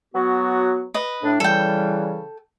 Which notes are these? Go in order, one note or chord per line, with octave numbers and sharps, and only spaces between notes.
F#3 B3 F#4
B4 D#5
A2 D4
C#3 E3 G3 A4 G5